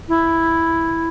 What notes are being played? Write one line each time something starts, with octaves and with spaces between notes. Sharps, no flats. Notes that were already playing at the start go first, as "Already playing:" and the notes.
E4